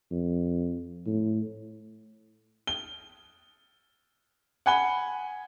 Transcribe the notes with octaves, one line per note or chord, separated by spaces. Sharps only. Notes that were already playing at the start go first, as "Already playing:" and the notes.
F2
A2
G7
F#5 G#5 B5 G7